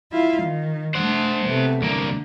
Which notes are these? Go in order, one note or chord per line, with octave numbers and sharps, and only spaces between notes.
E4 F4 F5
D#3
A3 D4 C5 F#5
C3 A3 B3
C2 D3 A#3